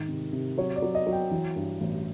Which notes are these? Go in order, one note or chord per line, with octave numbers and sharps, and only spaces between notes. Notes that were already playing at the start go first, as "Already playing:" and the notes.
Already playing: G#2 D#3
C3
C3
F#3 C#5
D5
F#3
D#5
F#3
G5
E3
G2
A1